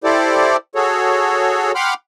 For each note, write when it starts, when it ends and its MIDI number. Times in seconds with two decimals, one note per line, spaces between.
0.04 0.56 64
0.04 0.56 67
0.04 0.56 69
0.04 0.56 72
0.04 0.56 74
0.75 1.72 66
0.75 1.72 68
0.75 1.72 69
0.75 1.72 73
1.75 1.94 78
1.75 1.94 79
1.75 1.94 83
1.75 1.94 84
1.75 1.94 86
1.75 1.94 89